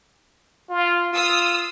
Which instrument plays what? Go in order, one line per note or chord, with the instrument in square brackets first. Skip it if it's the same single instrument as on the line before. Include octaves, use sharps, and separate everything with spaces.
[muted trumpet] F4
[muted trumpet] F4 [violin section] D#6 E6